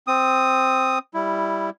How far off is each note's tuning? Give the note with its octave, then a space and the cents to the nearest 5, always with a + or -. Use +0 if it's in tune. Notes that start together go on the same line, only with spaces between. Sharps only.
C4 +0 D#6 +0
G3 +0 E4 +0